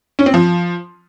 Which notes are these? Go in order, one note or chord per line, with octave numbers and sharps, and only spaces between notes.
C#4
C4
F3